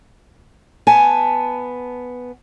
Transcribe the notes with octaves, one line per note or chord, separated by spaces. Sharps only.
B3 G#5 A5